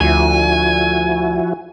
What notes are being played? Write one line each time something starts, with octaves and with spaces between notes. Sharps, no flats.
D2 F3 E4 F#4 G#5